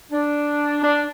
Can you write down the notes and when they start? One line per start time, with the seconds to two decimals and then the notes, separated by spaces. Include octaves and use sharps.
0.11 D4
0.82 D4